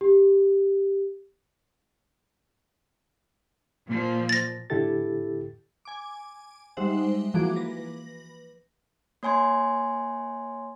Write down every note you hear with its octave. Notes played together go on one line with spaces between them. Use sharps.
G4
A#2 F3
A6 A#6
A2 D3 E4 G4 A4 A6
G#5 D6
G3 G#3 D#4 C5 E5 F#5
E3 F3 A#3 F#4 G#4 D6
B4 A#6
A#3 C#5 G#5 C6 G#6